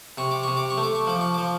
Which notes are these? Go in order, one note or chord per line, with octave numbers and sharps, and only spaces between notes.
C3 C#6
D6
C3 C#6
D6
C#6
A3
D6
C#6
F3 D6
C#6
F3 D6